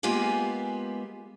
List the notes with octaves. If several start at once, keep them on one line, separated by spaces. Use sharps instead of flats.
G#3 A#3 B3 F4 G4 G#5